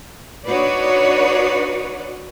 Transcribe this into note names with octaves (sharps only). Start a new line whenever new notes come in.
D4 D#4 F#4 B4 C#5 D5